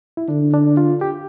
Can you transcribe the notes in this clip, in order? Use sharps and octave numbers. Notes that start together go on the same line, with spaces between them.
E4
D3 D4
D4
F4
G4